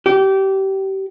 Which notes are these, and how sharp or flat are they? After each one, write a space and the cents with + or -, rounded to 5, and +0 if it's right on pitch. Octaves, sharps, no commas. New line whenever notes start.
G4 -25